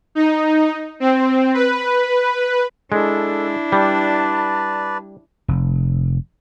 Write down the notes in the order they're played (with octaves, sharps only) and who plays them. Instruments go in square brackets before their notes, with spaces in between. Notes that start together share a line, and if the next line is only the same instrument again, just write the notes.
[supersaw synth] D#4
C4
B4
[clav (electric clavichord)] G#3 [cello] D4 E4 [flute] A4
[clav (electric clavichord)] G3 [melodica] B4 D5 [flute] A5
[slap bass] F1